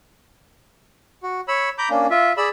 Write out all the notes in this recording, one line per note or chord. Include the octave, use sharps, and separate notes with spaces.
F#4
C#5 B5 E6
A#5 B5 D6 G6
A#3 C#4 D4
F4 E5
G#4 D5 B5 E6